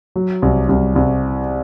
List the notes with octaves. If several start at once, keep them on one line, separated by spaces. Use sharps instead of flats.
F#3
C2
C2
C2